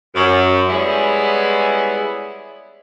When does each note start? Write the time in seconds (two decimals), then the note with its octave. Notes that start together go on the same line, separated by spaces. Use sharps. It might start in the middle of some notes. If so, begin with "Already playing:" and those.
0.15 F#2
0.69 G3 G#3 B3 C#4 E4 G#4